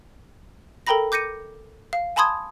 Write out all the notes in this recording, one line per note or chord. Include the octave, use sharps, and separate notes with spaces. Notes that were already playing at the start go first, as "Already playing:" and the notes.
A4 A#4 G5 A#5 B5 A#6
D6 G6 A#6 C#7 D#7
F5
G#5 A5 B5 C6 D#6 G#6